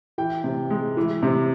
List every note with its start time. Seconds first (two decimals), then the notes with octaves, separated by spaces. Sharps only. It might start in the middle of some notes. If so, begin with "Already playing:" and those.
0.18 E3 G5
0.44 C3
0.70 G#3
0.97 E3
1.23 C3